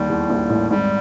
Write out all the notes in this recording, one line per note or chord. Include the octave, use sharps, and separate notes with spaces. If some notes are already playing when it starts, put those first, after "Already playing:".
Already playing: D#2 A#2 D3 D#3 G3
E2 E3
A#1 A#2
A1 A2
G#1 G#2 G3